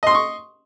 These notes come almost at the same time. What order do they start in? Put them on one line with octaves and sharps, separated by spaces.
D#5 C6 D#6 C#6